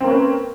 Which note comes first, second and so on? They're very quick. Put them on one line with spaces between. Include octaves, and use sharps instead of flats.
C4 A#3 C#4 B4